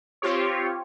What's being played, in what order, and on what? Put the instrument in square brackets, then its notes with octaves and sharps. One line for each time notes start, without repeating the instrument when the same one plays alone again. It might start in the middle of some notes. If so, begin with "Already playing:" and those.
[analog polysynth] C4 F4 G4 C#5